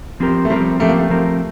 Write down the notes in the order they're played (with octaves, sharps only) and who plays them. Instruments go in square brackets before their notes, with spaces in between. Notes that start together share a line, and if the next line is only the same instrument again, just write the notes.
[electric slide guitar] F3 C4 G4 A#4
[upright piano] A3
[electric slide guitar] F3 C4 G4 A#4 [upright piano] G3
[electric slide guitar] F3 C4 G4 A#4 [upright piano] A3
[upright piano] A#3
A3
[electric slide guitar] F3 C4 G4 A#4